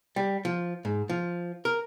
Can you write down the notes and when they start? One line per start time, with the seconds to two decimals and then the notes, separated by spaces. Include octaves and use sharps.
0.16 G3
0.45 F3
0.85 G#2
1.09 F3
1.65 A#4